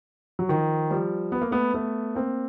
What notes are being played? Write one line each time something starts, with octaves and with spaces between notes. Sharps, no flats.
F#3
D#3 F3
F3 G3
B3
A#3
A3 B3
A3 B3
A#3 C4